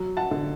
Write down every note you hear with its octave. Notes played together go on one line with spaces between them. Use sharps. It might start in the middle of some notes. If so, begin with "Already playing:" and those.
Already playing: F#3
F#5 A5
D3